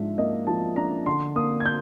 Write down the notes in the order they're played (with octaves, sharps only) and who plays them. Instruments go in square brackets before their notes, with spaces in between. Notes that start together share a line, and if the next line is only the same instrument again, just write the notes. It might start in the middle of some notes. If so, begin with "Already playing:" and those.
Already playing: [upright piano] G#2 F3 D4 E5
A#3 D#5
F3 A5
D4 A#5
D3 C6
A#3 D#6
G#6
G6